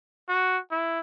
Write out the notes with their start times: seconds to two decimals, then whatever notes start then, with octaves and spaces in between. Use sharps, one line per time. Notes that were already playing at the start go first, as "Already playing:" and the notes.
0.29 F#4
0.71 E4